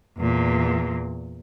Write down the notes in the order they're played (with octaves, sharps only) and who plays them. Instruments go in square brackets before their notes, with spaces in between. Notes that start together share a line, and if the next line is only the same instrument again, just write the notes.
[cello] E2 A#2